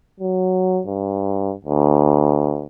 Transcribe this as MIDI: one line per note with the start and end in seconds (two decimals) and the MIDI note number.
0.20 0.81 54
0.87 1.53 43
1.65 2.67 38